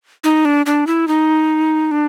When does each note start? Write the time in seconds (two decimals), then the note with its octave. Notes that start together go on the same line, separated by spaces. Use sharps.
0.24 D#4
0.45 D4
0.66 D4
0.87 E4
1.08 D#4
1.91 D4